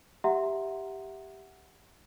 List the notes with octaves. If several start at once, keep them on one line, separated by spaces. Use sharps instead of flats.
G4 E5 F#5 A#5 C6